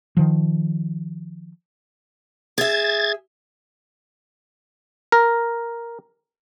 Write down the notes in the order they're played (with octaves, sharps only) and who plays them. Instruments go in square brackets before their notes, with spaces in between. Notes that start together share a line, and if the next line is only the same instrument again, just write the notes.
[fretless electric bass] D#3 F3
[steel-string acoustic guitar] G#4 E5 [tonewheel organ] G#6 A6
[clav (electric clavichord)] A#4